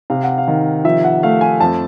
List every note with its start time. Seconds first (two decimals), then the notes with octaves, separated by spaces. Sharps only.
0.10 C3 F5
0.23 F#5
0.38 F5
0.48 D#3
0.85 F3 E5
1.04 F#5
1.23 A3 F5
1.41 G#5
1.60 F2 A5